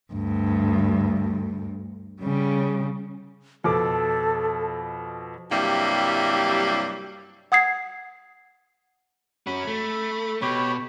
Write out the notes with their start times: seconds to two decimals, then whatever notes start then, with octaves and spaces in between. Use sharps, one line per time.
0.13 D2 G2
2.21 C#3 G3
3.64 F2 B2 A4 D6
5.51 G2 C3 F#3 G3 A#3 E4
7.52 F#5 D#6 G#6 C7
9.47 C#4 F#4 B5
9.68 A3
10.42 B2 G4 C#5 B5